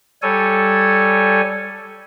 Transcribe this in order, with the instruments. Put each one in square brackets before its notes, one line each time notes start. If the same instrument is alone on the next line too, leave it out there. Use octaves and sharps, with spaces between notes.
[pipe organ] G3 A4 C#5 G#5